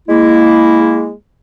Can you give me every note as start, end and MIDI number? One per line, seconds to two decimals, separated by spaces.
0.08 1.11 56
0.08 1.11 58
0.08 1.11 64